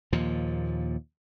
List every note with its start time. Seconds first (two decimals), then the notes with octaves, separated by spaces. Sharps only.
0.13 D#2 A#2 F3